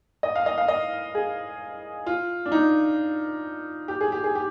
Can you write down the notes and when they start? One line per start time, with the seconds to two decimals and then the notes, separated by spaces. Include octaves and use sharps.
0.23 D#5
0.35 F5
0.46 D#5
0.58 F5
0.68 D#5
1.15 G#4
2.06 F4
2.46 D4
2.52 D#4
3.88 G4
4.01 G#4
4.12 G4
4.24 G#4
4.35 G4